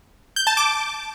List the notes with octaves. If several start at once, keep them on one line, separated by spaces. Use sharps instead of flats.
G6
A5
D6